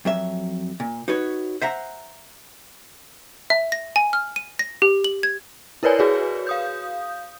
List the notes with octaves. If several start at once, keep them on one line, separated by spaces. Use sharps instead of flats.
F2 F#3 E5
A#2
D#4 F#4 B4 C#5
C5 E5 F#5 A#5
E5
A#6
G#5
F6
D#7
A#6
G4
F#7
G#6
E4 A#4 B4 C#5 D5 G#5
F#4 G#4 B4 C#5
F5 D#6 G6